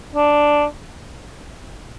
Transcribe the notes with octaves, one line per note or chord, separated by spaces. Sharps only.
D4